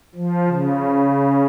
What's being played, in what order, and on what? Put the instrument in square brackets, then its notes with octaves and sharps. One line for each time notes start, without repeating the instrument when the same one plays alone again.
[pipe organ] F3
C#3